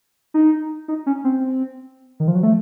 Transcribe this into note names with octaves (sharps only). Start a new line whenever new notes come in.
D#4
D#4
C#4
C4
D#3
F3
F#3
A3